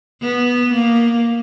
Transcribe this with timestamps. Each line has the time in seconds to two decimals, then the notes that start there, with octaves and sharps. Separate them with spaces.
0.22 B3
0.74 A#3